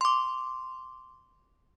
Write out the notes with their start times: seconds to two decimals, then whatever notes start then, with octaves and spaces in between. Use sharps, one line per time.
0.01 C6 D6